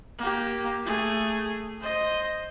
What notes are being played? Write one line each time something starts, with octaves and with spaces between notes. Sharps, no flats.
A#3 G4
A3 G#4
C5 D#5